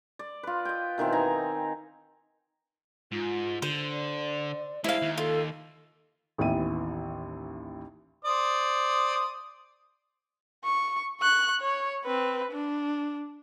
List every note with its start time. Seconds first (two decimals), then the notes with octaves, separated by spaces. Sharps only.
0.19 D5
0.43 F4 B4
0.65 D#5 G5
0.98 B2 D#3 E3 C4
1.12 D#4 G#5 A#5
3.12 G#2 F4
3.62 D3 C5
3.92 D5
4.84 G#3 D4 E4 C5 F5
5.02 D#2
5.18 F4 A4
6.38 A1 D#2 E3 B3 E5 D#7
8.25 C5 D5 D#6
10.64 C#6
11.20 C#6 F#6
11.60 C#5
12.05 C4 B4
12.52 D4